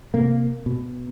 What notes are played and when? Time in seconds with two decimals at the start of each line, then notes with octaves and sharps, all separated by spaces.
0.14 C3 A#3
0.66 B2